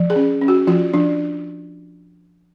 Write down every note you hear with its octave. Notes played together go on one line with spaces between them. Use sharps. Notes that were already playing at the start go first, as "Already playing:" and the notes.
Already playing: F3
G#4
C#4
C#4
F#4
F3 F4
F3 D4